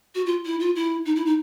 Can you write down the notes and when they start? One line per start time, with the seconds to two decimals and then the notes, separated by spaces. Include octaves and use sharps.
0.15 F#4
0.26 F4
0.45 E4
0.60 F4
0.76 E4
1.05 D#4
1.16 E4
1.26 D#4